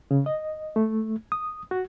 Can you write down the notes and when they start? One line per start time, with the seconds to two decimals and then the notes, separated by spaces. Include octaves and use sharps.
0.11 C#3
0.26 D#5
0.76 A3
1.32 D#6
1.71 F#4